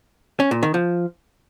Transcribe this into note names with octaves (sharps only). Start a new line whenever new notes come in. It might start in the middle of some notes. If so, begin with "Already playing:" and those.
C#4
A#2
D#3
F3